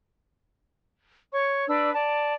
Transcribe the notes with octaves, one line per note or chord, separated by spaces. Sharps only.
C#5 C#6
D4 B4 D5 E6
D5 A5